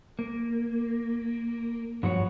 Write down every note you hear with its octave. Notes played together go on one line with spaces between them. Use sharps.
A#3
G2 F3 F#3 F#4 C#5